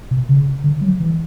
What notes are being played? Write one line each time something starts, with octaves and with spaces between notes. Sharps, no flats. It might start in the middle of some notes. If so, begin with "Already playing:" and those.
B2
C#3
D3
F#3
E3